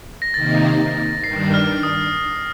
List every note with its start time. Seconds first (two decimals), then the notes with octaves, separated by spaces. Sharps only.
0.22 A#6
0.34 C3 D#3 A#3 D#4 A6
1.24 G2 D#3 G3 D4 C7
1.54 F6
1.83 D#6